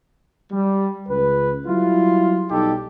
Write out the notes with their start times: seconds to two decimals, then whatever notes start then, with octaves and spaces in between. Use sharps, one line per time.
0.51 G3
1.08 C#2 B4
1.67 F#3 G3 E4 F4
2.50 B1 G3 D#4 G4 A4